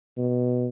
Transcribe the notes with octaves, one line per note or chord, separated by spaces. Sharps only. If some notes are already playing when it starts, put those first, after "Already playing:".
B2